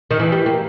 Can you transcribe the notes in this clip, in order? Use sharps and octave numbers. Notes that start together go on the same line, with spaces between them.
D#3
E3
G3
A#3